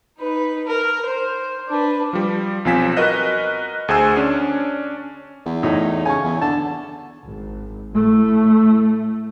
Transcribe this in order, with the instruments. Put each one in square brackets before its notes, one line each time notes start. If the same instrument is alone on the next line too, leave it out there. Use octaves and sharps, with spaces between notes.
[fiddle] D#4 B4
A#4
C5
D4 B4
[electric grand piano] F3 G3
B1 F3 C4 G#5 B6 E7
F#4 A#4 B4 D#5 F#6
D2 G#4 C5 G#5 E6
C#4 D4
[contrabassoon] E2
[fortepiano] A2 D#4 C#5
[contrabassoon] C#3 [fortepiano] G#5 C#6
[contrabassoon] E2
[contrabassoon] D3 [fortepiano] A5
[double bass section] G#1
A2 A3